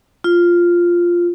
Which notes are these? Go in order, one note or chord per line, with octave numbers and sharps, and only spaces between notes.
F4